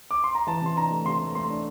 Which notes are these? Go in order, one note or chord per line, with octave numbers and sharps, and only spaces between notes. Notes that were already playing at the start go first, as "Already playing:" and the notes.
D6
C6
A#5
E3 A5
C3 C6
D4 A#5
A3
C3 C6
A3
A3 C6
D4